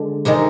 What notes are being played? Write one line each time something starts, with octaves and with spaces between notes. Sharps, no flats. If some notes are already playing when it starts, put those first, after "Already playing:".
Already playing: D3 G#3
C3 D#3 G#3 G#4